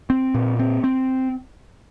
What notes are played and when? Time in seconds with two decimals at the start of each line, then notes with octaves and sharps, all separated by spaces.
0.10 C4
0.34 A#2
0.59 C4
0.84 C4